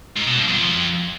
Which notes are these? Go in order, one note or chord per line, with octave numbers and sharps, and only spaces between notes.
G#2
B2
G2
F2